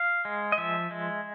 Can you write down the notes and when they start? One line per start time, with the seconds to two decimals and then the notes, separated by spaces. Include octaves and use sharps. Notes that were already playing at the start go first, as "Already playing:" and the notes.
Already playing: F5
0.25 G#3
0.52 D#5
0.58 F3 E5
0.91 G#3